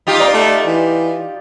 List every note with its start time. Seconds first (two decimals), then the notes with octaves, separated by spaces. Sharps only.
0.07 D#4 F4 G4
0.20 D5 A#5
0.34 A3
0.67 E3